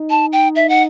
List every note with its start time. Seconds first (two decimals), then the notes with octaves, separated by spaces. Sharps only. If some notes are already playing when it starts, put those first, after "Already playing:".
Already playing: D#4
0.10 A5
0.33 G5
0.56 E5
0.69 F#5